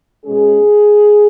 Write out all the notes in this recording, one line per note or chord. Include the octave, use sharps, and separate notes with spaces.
B2 G#3 C#4 G#4